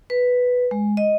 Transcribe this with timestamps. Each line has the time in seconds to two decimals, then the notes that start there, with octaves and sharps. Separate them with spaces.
0.10 B4
0.71 G#3
0.97 D#5